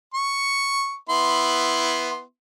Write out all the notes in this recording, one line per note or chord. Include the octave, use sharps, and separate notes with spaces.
C#6
B3 E4 C6